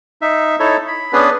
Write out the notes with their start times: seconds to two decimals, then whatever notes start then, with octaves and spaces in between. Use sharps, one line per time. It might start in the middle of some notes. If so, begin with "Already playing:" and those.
0.22 D#4 E5
0.60 D#4 E4 A4 C#5
0.88 B5
1.13 B3 C#4 D4 G#4 B4